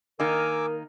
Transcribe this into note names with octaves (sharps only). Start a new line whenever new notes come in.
D#3 A#3 D#4 A#4 G#5 D6 E6